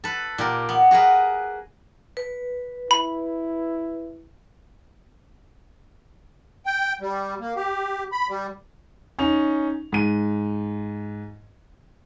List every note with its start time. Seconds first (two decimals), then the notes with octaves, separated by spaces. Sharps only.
0.04 A4 B4
0.38 A#2 G4 A#4
0.69 B3
0.91 F#4 G#4 A#4 B4
2.17 B4
2.91 E4 B5
6.66 G5
7.01 G3
7.40 A#3
7.56 G4
8.12 B5
8.29 G3
9.19 C#4 D#4 F7
9.92 G#2 D#7